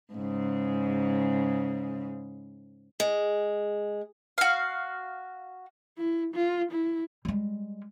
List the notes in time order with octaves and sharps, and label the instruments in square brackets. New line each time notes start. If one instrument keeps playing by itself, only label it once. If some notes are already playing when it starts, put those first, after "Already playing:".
[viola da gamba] G#2 C#3
[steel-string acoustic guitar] G#3
[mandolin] F#4 F5
[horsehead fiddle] E4
F4
E4
[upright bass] G3 G#3